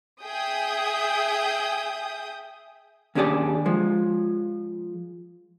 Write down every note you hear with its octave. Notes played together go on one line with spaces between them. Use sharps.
G#4 E5 G5 D#6 G6
D#2 C#4 D4 G4 G#4 D5
F3 G#3